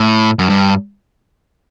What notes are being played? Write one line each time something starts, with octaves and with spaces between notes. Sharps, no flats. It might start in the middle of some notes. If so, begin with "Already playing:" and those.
Already playing: A2
F#2
G2